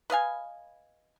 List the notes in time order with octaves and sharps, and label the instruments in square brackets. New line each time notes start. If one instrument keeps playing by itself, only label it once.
[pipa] B4 D#5 F5 G#5